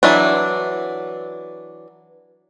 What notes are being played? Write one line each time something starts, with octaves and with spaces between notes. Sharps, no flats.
E3 F#3 D4